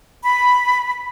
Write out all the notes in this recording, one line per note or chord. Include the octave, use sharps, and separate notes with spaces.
B5